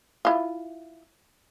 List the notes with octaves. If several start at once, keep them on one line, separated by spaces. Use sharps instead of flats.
E4 F4